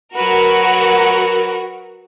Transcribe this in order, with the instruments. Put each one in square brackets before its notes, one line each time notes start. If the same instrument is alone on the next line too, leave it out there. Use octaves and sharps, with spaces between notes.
[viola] F#3 B4 [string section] F#4 A#4